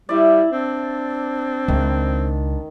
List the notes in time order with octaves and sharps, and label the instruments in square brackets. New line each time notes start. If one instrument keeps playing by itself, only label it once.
[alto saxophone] G3 [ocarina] E4 [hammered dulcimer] D5 E5
[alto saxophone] C4 [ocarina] D4
[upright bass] C#2 [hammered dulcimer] D#3